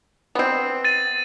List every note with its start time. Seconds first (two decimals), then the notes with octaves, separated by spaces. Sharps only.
0.35 B3 C4
0.85 A6 D#7